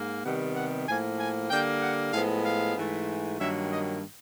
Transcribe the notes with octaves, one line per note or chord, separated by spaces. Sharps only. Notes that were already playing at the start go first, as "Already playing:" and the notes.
Already playing: G#2 A#3
C3 D#3 G3 B3 F#5
F#5
A2 F3 A#3 G#5
G#5
D3 G3 A#3 G5
F#5
A2 F3 G#3 B3 F5
F5
G#2 E3 A3
G2 D#3 F#3 A#3 E5
D#5